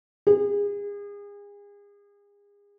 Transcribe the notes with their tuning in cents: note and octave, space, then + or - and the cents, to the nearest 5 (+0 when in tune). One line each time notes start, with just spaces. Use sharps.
G#4 -35